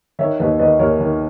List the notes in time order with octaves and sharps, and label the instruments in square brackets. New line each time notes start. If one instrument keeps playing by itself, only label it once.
[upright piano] D#3 C#5 E5
D#2 B4 D#5
D#3 B4 D#5
D#2 A#4 C#5
D#3